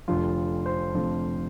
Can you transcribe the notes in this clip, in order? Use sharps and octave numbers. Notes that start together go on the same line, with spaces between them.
F1 F2 D3 F3 F4
C5
F1 F2 D3 F3